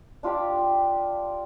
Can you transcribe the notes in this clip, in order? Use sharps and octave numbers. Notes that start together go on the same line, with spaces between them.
D4 F4 G4 D5